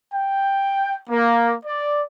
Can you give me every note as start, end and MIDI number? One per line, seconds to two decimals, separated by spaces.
0.13 0.98 79
1.10 1.55 58
1.65 2.01 74